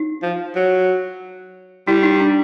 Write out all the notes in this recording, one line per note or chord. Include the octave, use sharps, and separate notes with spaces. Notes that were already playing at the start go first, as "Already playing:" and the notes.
Already playing: D#4
F3
F#3
G3 E4
D#4
D4